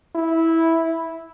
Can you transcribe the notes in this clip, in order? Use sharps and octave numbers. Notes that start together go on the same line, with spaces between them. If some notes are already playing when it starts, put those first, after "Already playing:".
E4